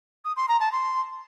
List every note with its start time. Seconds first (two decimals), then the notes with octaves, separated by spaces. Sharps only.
0.25 D#6
0.36 C6
0.48 A#5
0.60 A5
0.72 C6